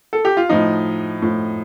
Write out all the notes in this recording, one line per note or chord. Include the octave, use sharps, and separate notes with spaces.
A4
G4
F4
A2 F3 D#4
A2 F3